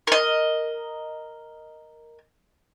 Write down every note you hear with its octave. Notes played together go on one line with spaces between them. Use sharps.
A#4 D#5